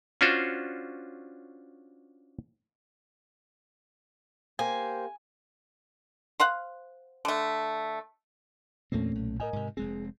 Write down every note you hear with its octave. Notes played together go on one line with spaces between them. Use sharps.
C#4 D4 F4 F#4 C5
A#3 G4 C5 G#5
C5 F5 F#5
D3 A3
E2 A#2 A3 A#3 C4 C#4
B1
A2 A#4 D#5 G#5
G#2 C3
F1 G#3 C4 G#4